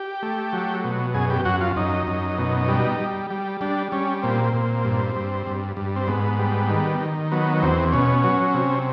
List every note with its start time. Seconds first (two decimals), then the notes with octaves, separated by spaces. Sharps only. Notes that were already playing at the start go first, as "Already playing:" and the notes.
Already playing: G4
0.23 A3
0.53 F#3
0.84 B2
1.14 F#2 G#4
1.30 G4
1.45 F#2 F#4
1.61 F4
1.76 F#2 D#4
2.07 F#2
2.38 B2
2.68 G3
3.00 G3
3.30 G3
3.61 G3 D4
3.92 G3 C#4
4.23 A#2 C4
4.54 A#2
4.85 G2
5.16 G2
5.46 G2
5.77 G2
5.96 C4
6.08 G#2 B3
6.39 G3
6.70 D#3
7.01 D#3
7.32 F#3 B3
7.62 E2 C4
7.92 B2 C#4
8.24 F#3
8.54 C3